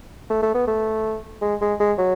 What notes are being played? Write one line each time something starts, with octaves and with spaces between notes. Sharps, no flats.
A3
A3
B3
A3
G#3
G#3
G#3
F#3